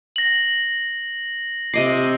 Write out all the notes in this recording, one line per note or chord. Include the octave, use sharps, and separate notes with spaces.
A#6 F#7
C3 D#5 D6 C7